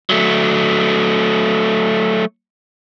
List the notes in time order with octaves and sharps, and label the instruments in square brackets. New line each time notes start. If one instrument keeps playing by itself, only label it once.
[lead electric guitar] F#3 A3